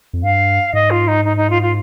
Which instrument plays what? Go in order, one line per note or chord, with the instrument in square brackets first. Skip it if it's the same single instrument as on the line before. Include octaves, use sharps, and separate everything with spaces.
[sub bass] F2
[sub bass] G2 [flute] F5
[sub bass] G#2 [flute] D#5
[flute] F4
D#4
D#4
D#4
F4
F4